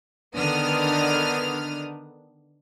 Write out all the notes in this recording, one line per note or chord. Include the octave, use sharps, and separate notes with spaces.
D3 D#3 B3 D4 D#6 F6